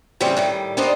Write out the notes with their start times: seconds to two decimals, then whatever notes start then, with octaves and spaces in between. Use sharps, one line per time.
0.21 C#3 E3 G3 A3 C4 F4
0.37 A2 D#3 G3
0.77 G3 B3 D4 D#4 C5 D#5